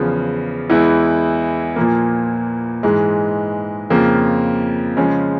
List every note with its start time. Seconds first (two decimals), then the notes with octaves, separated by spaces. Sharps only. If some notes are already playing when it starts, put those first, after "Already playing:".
Already playing: E2 C#3 F3
0.70 E2 E3 G#3 E4
1.76 A#2 F3 A#3
2.83 G#2 E3 G#3
3.90 F2 C#3 F3 A#3
4.97 C#3 F3 G#3 C#4